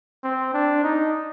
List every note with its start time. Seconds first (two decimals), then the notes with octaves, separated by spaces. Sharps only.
0.23 C4
0.54 D4
0.84 D#4